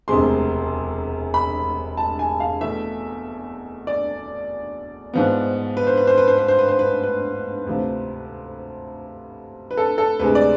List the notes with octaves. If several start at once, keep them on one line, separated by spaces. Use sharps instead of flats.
E1 D2 C3 G#3 C6
B5
A5
G#5
F5
E2 B2 A3 E5
D5
G#2 F3 B3
B4
C5
B4
C5
B4
C5
B4
C5
B4
C5
B4
B4
D2 C3 F3
B4
A4
A4
D2 C3 G#3 B4
D5